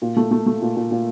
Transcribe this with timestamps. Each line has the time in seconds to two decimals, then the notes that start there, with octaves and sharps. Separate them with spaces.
0.02 A#2
0.17 A3
0.31 A3
0.47 A3
0.62 A#2
0.76 A#2
0.91 A#2